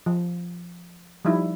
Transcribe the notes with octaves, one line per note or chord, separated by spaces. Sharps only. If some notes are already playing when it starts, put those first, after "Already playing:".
F3
F3 G3 D#4 E4